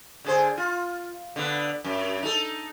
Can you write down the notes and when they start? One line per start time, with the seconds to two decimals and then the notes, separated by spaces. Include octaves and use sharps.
0.25 D3 G#4 C5
0.57 F4
1.36 D3 B3
1.84 F#2
2.23 D#4 A4